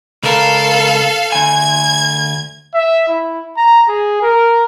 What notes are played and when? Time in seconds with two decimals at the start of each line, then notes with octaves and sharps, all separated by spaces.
0.23 C#2 A4 A#4 F5
1.32 D2 G#5 G#6
2.74 E5
3.09 E4
3.57 A#5
3.89 G#4
4.22 A#4